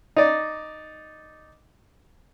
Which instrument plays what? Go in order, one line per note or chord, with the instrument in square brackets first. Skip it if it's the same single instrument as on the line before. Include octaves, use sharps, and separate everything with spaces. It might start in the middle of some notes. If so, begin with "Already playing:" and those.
[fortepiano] D#4 D5